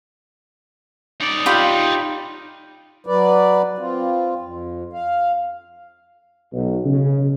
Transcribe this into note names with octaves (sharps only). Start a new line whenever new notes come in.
D#4 D5
F4 G4 B5
F#3 B4 D5
C4 F4
F2
F5
B1
C#3